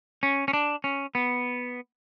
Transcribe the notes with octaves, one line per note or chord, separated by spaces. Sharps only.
C#4
C#4
D4
C#4
B3